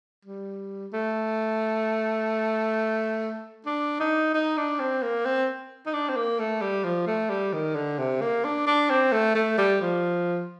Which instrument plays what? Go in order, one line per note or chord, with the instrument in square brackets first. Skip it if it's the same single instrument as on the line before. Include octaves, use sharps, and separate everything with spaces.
[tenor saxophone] G3
A3
D4
D#4
D#4
D4
C4
A#3
C4
D#4
D4
C4
A#3
A3
G3
F3
A3
G3
D#3
D3
C3
A#3
D4
D4
C4
A3
A3
G3
F3